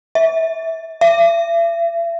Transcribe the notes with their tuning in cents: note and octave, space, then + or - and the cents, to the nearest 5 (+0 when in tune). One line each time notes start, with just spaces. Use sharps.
E5 -20
E5 +40